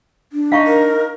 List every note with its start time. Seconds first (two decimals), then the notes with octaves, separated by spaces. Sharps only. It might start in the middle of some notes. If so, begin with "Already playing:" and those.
0.33 D4
0.52 D#4 F5 C#6
0.66 A#4